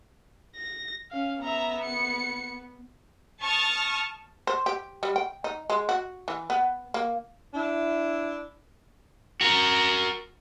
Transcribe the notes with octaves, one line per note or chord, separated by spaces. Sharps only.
A#6
C#4 F5
B3 E5 A#5
C#7
A5 C#6 D#6 F6
C5
G4
G3
G5
D#4
G#3
F#4
E3
B3
A#3
D4 E4
F#4 A#4